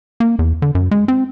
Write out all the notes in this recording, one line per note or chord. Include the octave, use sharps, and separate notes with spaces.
A#3
E2
D3
F#2
G#3
C4